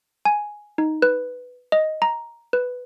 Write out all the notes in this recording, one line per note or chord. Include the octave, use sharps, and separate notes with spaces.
G#5
D#4
B4
D#5
A#5
B4